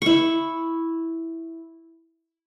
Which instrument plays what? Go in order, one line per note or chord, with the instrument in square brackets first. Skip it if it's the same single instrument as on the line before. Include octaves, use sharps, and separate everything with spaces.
[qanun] E4 C#6